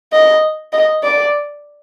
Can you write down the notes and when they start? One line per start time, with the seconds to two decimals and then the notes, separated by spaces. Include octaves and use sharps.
0.12 D#5
0.73 D#5
1.03 D5